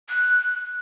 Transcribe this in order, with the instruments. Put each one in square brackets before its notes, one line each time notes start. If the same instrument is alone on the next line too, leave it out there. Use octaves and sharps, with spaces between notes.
[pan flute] F#6